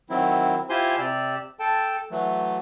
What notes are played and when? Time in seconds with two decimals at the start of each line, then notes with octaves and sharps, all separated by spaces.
0.10 D#3 F#3 C4 E4
0.69 E4 F4 G4 C5 G#5 C6
0.98 C3 G4 D5 E6
1.59 A4 G5 A5
2.11 E3 F#3 A3